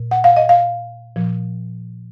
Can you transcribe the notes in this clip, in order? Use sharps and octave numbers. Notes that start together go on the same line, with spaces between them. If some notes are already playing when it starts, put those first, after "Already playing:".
Already playing: A#2
F#5
F5
D#5
F5
A#2 F3